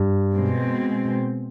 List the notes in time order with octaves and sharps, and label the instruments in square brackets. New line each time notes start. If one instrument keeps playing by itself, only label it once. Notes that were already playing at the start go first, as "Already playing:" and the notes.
Already playing: [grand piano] G2
[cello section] B2 G#3 C4